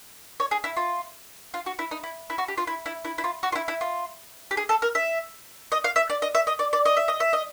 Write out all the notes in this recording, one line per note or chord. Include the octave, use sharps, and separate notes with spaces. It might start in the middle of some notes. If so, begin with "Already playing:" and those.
C#5
G#4
E4
F4
F4
F#4
E4
D#4
E4
E4
F#4
G4
F4
E4
E4
E4
E4
F4
F#4
F4
E4
E4
F4
G4
G#4
A4
A#4
E5
D#5
F5
E5
D5
D#5
E5
D#5
D5
D5
D#5
E5
D#5
E5
D#5